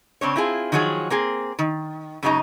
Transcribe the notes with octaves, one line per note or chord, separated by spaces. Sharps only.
C#3 C4 D4 C#5
C4 E4 F4 G#4
D#3 F3 F#3 F#4 G#4
A#3 C4 G#4
D#3
F#2 C#3 G#3 D#4 G#5 A#5